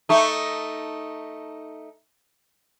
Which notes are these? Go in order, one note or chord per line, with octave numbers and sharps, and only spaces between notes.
A3 D#4